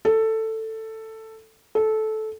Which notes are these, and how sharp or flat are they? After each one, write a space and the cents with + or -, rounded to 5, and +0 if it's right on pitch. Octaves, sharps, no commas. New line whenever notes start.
A4 +10
A4 -15